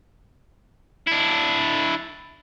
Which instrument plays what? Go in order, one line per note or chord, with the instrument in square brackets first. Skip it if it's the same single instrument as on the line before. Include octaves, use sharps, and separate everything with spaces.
[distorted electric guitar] D4 E4